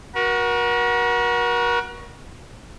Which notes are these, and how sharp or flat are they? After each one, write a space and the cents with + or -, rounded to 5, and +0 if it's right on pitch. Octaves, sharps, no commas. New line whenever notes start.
F#4 +0 A#4 +40